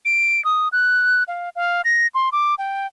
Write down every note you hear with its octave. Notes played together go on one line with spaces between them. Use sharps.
D7
D#6
F#6
F5
F5
A#6
C6
D6
G5